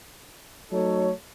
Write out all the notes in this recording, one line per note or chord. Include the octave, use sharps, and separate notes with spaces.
F#3 A3 D#4 A4 C#5